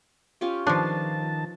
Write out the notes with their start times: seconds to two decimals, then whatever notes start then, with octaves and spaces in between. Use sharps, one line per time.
0.41 C#4 F4 G4
0.67 D#3 F3 D4 B4 F5 A5